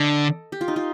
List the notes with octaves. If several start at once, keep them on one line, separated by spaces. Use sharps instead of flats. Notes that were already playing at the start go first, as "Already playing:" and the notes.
Already playing: D3 A4 D#5
G4
F4
D#4
F4